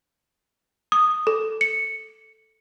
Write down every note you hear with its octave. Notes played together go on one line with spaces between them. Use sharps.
D#6
A4
C#7